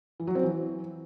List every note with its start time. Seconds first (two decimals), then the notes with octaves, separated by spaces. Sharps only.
0.20 E3
0.27 F#3
0.35 C4
0.43 E3